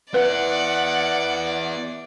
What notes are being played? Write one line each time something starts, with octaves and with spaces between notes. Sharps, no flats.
B3 E4 B4 D5 F#5